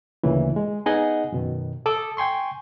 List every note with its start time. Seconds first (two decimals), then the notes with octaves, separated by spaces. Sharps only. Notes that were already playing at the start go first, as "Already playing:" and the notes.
0.23 D2 A#2 C#3 E3
0.56 G#3
0.86 B3 D#4 G#4 D#5 F#5 G#5
1.32 F#2 B2 D#3
1.86 A4 D6 D#6
2.17 G5 G#5 C6 C#6